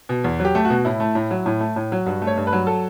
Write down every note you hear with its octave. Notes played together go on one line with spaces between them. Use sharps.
B2
E2
F#3
G4
A3
F#4
B2
A2 E4
A3
A2
F#3
A2
A3
A2
F#3
G2 F#4
A3
C#5
G2
B4
F#3
A4